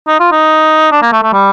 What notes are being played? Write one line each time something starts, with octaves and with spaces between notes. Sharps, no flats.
D#4
F4
D#4
D4
A#3
A3
A3
G3